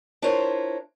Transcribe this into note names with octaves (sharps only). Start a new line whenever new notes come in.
D4 E4 F4 A#4 C5 C#5